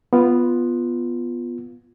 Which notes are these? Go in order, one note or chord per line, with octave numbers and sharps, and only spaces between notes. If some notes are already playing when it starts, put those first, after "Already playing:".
B3 F4